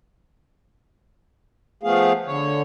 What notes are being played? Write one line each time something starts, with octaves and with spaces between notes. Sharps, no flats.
F3 A3 B3 G#4 F5
D3 C#5